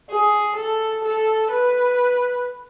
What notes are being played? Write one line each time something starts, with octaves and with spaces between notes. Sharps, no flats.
G#4
A4
A4
B4